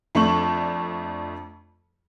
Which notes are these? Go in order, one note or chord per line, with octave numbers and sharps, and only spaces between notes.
F2 A3 D4 C#6 F#7